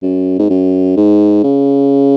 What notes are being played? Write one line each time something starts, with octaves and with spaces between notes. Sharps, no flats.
F#2
G#2
F#2
G#2
C#3